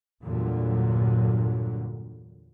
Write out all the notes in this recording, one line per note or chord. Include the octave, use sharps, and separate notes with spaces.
E2 G2 A#2 D3 F#3